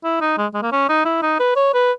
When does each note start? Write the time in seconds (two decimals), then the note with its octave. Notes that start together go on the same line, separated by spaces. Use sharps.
0.04 E4
0.21 D#4
0.38 G#3
0.54 G#3
0.63 A#3
0.72 C#4
0.89 D#4
1.05 E4
1.22 D#4
1.40 B4
1.56 C#5
1.74 B4